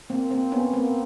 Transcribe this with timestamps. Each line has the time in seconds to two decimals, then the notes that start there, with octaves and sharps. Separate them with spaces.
0.10 A#3 C4
0.31 A#3 C4
0.52 B3 C#4
0.73 A#3 C4